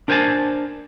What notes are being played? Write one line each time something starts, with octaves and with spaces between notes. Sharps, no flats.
D4 A#4 C5 D5 G#5 A5